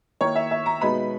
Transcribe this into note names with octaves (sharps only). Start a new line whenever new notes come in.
D#3 A#3 E4 C#5
E5
E5
A#5
B2 G#3 B3 D#4 B5